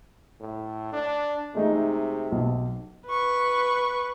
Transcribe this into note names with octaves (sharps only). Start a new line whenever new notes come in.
A2
D4
C3 G#3 A3 D#4
B1
B4 C#6